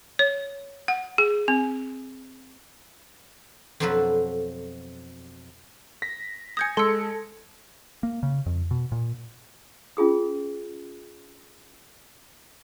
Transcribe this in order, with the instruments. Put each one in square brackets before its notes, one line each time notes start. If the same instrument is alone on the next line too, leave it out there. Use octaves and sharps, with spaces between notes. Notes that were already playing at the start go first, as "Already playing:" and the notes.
[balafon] C#5
F#5
G#4
C4
[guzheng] F2 B2 F3 F#3 A4 B4
[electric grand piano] A#6 B6
[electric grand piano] G#5 G#6 A#6 [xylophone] D#6 G6 C#7
[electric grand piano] G#3 C#7 [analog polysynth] A4 [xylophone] C6 E6
[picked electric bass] A#3
C#3
F2
B2
A#2
[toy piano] C#4 F4 G#4 D#6